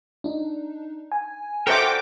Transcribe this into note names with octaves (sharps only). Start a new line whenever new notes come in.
D4 D#4
G#5
D4 F#4 A4 A#4 C5 E5 G5 D6